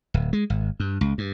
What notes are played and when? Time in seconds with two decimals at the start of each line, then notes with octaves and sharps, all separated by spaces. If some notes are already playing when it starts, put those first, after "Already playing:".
0.14 D1
0.33 G#3
0.50 G#1
0.80 G2
1.01 C#2
1.18 G2